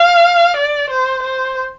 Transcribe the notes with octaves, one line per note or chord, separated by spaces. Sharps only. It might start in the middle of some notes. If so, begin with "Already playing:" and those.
Already playing: F5
D5
C5
C5